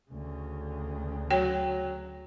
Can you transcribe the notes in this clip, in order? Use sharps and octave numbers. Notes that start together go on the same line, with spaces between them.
D2 C#3
F#3 C#5 G5